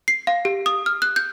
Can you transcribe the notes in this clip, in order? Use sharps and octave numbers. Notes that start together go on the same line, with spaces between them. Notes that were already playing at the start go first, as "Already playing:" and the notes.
C7
F5
G4
D#6
F6
F#6
G6